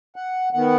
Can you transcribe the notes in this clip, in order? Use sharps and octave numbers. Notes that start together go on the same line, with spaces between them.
F#5
D#3 B3 F#5